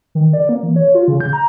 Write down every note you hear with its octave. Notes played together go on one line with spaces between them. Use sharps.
D#3
D5
A#3
E3
C#5
F4
C#3
G6
A#5